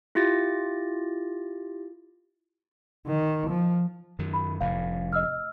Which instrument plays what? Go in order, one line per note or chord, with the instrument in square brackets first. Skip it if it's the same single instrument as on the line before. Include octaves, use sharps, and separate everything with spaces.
[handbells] E4 F4 G4 A6 A#6
[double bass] D#3
F3
[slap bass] F#2 D#3
[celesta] B5
[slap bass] F1 A2 [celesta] F5
[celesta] D#5 E6 F6